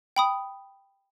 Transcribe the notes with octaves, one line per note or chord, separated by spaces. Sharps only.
G5 B5 D#6